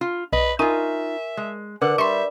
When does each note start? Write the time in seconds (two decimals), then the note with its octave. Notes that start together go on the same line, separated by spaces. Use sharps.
0.01 F4
0.33 B1 B4 D#5
0.59 D#4 F4 A#4 E5 G#5 C#6 D#7
1.37 G#3
1.81 D3 A#4 B4 F#5 D6
1.98 G3 E5 C6 C#6